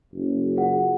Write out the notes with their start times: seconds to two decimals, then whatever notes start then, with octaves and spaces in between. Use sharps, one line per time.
0.12 F#1
0.56 F4 G#4 F#5